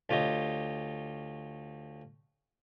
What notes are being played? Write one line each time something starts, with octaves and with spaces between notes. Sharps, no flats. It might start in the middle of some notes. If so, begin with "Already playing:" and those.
D2 F4 G4 C#5 D#5